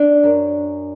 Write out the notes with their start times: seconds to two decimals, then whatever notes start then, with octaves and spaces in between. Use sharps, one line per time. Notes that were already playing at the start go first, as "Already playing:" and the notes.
Already playing: D4
0.23 F#2